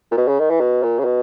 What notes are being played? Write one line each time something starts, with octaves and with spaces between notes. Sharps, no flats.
A#2
B2
C#3
D#3
E3
B2
A#2
C#3
B2